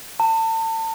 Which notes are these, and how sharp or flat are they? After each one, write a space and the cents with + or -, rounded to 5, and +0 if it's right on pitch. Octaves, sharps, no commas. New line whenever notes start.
A5 +35